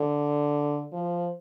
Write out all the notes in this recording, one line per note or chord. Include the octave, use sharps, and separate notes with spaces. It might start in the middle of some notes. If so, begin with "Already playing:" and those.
Already playing: D3
F3